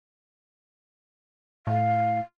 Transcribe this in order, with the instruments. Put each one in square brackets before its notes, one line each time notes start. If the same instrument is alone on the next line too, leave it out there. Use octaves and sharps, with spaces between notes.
[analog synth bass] A2 [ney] F5